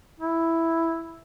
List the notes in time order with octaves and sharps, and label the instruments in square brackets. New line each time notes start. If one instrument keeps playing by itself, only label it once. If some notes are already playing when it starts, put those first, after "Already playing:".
[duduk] E4